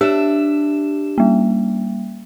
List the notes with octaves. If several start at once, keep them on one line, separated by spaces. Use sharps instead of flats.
D4 G4 E5 E7
G3 A#3